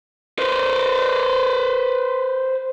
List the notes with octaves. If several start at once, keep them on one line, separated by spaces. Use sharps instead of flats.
B4 C5